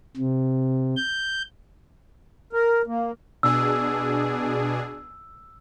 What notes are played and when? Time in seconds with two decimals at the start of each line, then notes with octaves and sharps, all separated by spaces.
0.17 C3
0.96 G6
2.53 A#4
2.87 A#3
3.43 B2 D4 G#4 E6